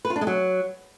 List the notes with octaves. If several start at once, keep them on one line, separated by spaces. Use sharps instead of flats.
B4
F4
D4
G#3
F#3